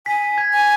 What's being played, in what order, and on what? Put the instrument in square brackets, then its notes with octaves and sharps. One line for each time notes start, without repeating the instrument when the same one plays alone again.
[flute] G#5 [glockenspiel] B6
[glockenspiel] G#6
[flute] G#5